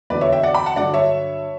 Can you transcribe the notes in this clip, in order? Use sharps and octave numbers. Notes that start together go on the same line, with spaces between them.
E2 D3 F#3 B4 D5
C#5 E5
E5 G5
D5 F#5
G5 B5
F#5 A5
G2 D3 F#3 D5 F#5
C#5 E5